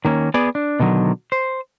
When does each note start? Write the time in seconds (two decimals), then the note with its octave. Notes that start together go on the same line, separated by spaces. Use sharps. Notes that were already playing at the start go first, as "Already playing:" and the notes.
0.05 D#3 A#3 C#4
0.34 B3 G#4 D5
0.55 D4
0.80 B2 D3 D#3 F#3
1.32 C5